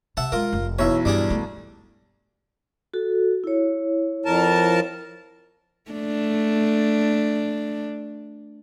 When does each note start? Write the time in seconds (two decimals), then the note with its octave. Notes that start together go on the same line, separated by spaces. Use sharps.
0.17 C3 E5 F#5 A5
0.32 G#3 F4 A#4
0.53 F1
0.79 B1 E3 C#5 E5
1.05 G2 G3 D4 G#4
1.30 A3
2.94 F#4 A4
3.44 E4 C#5
4.25 F2 A#4 A5
5.91 A3 D4